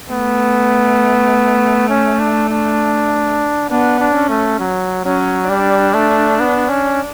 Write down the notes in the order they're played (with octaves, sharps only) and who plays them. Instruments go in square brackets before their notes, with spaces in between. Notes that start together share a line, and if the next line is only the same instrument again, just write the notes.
[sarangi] A3 [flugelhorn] B3
[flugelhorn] C#4
D4
D4
[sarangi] B3 [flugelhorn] D4
[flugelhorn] D4
[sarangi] C#4
[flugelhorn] A3
F#3
[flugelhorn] F#3 [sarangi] C#4
[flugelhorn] G3 [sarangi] D4
[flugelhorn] A3
B3
C#4